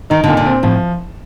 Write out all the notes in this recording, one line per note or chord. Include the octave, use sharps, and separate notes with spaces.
D#3 D#4
A#2 D3
D3
C4
A2 F3